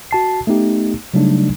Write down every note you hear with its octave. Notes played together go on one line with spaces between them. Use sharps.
F#4 A5 C7
A3 B3 D#4 G4
C#3 F#3 G3 A3 D4 D#4